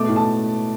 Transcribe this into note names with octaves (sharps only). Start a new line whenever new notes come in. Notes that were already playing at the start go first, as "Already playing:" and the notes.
Already playing: B2 A3 D6
A2
A5